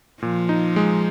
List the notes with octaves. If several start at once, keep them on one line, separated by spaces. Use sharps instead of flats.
A#2 F3
D#4
G#3